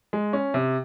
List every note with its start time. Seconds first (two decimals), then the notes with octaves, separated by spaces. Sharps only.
0.13 G#3
0.33 C#4
0.54 C3